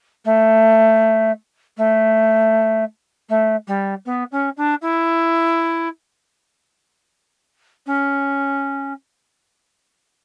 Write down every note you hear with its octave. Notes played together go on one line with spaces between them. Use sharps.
A3
A3
A3
G3
B3
C#4
D4
E4
C#4